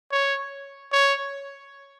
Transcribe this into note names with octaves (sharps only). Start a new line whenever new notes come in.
C#5
C#5